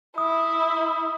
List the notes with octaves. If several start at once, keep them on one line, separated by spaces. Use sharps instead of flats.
E4 D#6